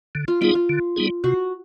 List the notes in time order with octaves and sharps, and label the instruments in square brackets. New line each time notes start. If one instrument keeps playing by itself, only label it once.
[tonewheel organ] D3
[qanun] F4
[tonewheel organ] G3 B3 D#4 G#4 [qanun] F4
[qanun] F4
[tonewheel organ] D3
G3 B3 D#4 G#4
[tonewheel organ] C3 [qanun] F#4